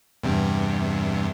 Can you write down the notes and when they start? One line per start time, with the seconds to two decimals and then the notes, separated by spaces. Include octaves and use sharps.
0.23 E2 G2 C3